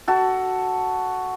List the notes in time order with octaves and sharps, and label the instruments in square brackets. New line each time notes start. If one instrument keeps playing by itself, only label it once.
[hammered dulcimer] F#4 A4